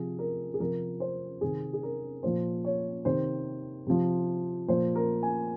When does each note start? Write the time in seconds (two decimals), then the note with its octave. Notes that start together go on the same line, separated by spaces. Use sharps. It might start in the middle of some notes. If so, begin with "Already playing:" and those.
Already playing: C3 F3 G#4
0.19 A#4
0.54 G#4
0.60 C3 F3 A#4
1.00 C5
1.41 C3 D#3 G#4
1.73 G#4
1.83 A#4
2.23 A#2 F3 C5
2.65 C#5
3.05 C3 D#3 C5
3.87 C3 F3
4.68 A#2 F3 C5
4.95 A#4
5.23 G#5